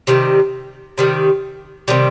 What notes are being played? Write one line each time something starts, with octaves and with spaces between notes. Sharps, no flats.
C3 D#3 G3
C3 D#3 G3
C3 D#3 G3